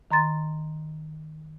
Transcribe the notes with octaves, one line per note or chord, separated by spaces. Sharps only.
D#3 A#5 C6 A6